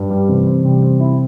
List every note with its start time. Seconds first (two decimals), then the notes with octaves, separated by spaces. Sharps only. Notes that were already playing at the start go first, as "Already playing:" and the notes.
Already playing: G2
0.10 G3
0.28 C3 E3 C4
0.47 C4
0.64 C3 G3
0.82 C4
1.00 E4